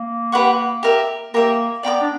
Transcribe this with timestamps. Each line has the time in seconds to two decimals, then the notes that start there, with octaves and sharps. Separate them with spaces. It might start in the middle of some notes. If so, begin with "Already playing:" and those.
Already playing: A#3
0.32 G4 B4 F#5 C#6
0.83 G4 A#4 E5
1.34 A#3 G4 A#4 E5
1.83 B3 D5 G5 A#5 D6
2.01 D4